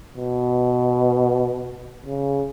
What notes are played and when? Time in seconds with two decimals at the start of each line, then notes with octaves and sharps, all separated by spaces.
0.16 B2
2.05 C#3